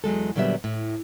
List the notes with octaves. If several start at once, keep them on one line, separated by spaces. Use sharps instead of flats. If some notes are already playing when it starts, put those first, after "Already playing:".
E2 F#3 G#3 A4
A#2 D3 F#3 G3 B3 E5
A2